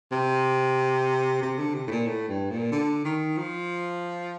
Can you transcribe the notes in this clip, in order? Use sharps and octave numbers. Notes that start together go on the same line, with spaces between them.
C3
C3
D3
C3
A2
A#2
A2
G2
A#2
D3
D#3
F3